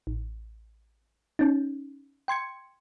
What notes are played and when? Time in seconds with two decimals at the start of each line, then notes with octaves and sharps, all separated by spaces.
0.07 A1
1.39 C#4 D#4
2.28 G5 C6 G#6 C#7